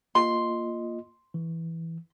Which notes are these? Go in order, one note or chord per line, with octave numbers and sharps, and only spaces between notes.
A#3 F4 D#5 C6
E3